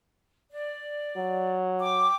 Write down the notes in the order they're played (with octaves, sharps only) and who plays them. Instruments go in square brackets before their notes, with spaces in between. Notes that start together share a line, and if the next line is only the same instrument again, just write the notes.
[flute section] D5
[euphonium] F#3
[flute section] G5 D6